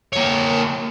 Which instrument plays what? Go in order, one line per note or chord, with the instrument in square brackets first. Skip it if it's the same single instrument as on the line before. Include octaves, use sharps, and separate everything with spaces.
[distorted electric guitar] A#3 C#5